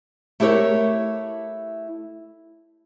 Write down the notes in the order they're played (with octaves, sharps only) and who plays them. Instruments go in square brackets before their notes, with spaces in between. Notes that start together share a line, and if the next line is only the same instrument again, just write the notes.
[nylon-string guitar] A3 E4 G4 A#4 C#5